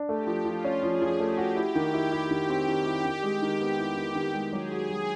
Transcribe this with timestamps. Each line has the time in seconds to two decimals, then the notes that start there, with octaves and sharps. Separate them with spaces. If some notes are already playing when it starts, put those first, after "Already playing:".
Already playing: D4
0.09 A3 G4
0.27 F3
0.45 F3 F4
0.64 C#4
0.83 F3 G#4
1.02 F3
1.20 A3 G4
1.38 F#4
1.56 E4 G4
1.75 D#3
1.94 E4
2.12 E4
2.31 D#3 G4
2.49 C4
2.68 D#3
2.86 E4
3.04 D#3
3.23 G#3
3.42 D#3
3.61 B3
3.79 E4
3.97 D#3
4.15 D#3
4.34 G#3
4.52 F#3 G#4
4.71 F#4
4.89 F#3